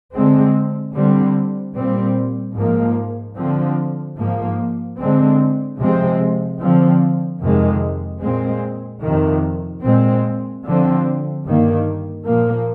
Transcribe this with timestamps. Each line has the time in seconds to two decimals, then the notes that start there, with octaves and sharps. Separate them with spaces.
0.14 D3 G#3 C4
0.95 D3 G3 C4
1.75 A#2 G3 C4
2.55 G#2 F3 A#3
3.36 D3 F3 C4
4.17 G#2 F3 A#3
4.98 D3 G#3 C4
5.78 C3 F3 G#3 C4
6.59 D3 F3 C4
7.41 F2 C3 D#3 G#3
8.21 A#2 G#3 C4
9.02 F2 C3 D#3
9.83 A#2 G#3 C4
10.64 D3 F3 C4
11.45 G2 D#3 A#3
12.25 A#2 F3 A#3